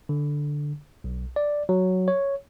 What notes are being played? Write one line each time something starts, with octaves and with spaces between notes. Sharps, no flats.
D3
B1
D5
F#3
C#5